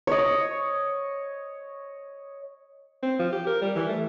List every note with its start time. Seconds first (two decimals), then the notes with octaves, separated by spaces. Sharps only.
0.07 C#5 D#5
3.03 C4
3.19 F3
3.33 G4
3.47 A#4
3.61 G3
3.76 E3
3.89 A3